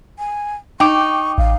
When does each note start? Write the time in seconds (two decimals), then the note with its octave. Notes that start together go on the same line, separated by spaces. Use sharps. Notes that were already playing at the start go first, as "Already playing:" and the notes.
0.19 G#5
0.80 D#4 G5 C#6 D6
1.38 A1 F5